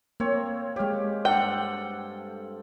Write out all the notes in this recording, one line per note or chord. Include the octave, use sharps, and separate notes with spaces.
A#3 C4 C#5
G#3 G4 C#5 F5
G2 A4 F#5 G5